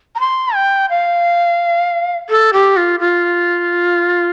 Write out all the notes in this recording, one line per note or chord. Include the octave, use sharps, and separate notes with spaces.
A#5
C6
G5
F5
A4
G4
F4
F4